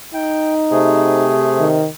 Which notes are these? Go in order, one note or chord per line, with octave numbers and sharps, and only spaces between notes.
D#4 G5
C3 A3 G#4
D#3